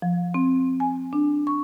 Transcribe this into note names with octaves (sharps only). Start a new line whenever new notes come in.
F3
C4
G#5
D4
C#6